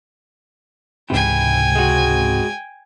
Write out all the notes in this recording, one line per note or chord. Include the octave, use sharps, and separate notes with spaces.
C#2 G#2 C3 E3 G5 G#5
G#3 F#4